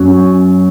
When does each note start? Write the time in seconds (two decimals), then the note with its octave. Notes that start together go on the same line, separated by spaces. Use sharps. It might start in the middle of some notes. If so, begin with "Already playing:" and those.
Already playing: F#2 F#3 C#4